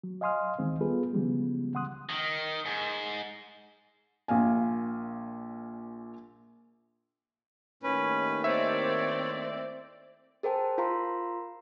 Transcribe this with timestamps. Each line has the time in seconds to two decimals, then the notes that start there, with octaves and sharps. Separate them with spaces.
0.04 F#3
0.21 D#5 F5 G#5 C6 D#6 F6
0.59 D2 D#3 E3 G#3 C4
0.81 G3 B3 F4 G#4 A4 B4
1.13 C#3 E3 F3 G3 G#3 B3
1.73 C#2 C#3 F#5 C6 D#6 F#6
2.10 D#3
2.66 G#2
4.28 A#1 A#2 F5 G#5
7.83 D#2 A2 D#3 C#4 B4
8.44 C4 C#5 D5 E5
10.43 G#4 A#4 C5 G5 A5
10.78 F4 A#4 F5 A#5 C6